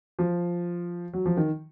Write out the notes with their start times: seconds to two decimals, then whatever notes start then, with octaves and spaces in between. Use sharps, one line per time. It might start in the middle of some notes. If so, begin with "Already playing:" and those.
0.19 F3
1.13 F#3
1.26 F3
1.37 D#3